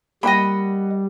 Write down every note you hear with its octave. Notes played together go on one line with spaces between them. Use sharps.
G3 A#3 E4 D#5 F#5 G5 B5